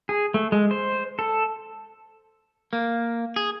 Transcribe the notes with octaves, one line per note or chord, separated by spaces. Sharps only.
G#4
A3
G#3
C5
A4
A#3
G#4